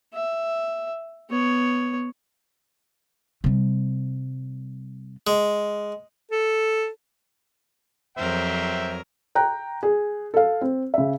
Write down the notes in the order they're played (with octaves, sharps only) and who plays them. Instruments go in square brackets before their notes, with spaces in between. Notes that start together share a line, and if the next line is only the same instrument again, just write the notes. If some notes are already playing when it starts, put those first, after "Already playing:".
[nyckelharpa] E5
B3 C#5
[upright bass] C3 G3
[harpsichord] G#3
[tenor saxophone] A4
[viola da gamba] F2 F#3 A#4 [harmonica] C5 E5 G5
[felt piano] G5 A#5 F#6
G#4
A4 F5
C4
C#3 E5